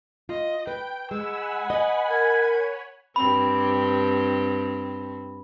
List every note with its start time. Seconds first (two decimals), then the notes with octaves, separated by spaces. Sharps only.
0.29 F4 D#5
0.67 B4 G5
1.11 G#3 F#5 G#5 B5 E6
1.70 B4 D#5
2.10 A#4 G#6
2.48 C#5
3.16 G2 C4 B5